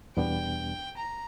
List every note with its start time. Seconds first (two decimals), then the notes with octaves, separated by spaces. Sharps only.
0.16 E2 B2 G3 B3 D4 G5
0.97 A#5